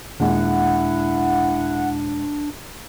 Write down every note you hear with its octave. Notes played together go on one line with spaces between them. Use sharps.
D#2 A#2 G#3 D4 E4 F#5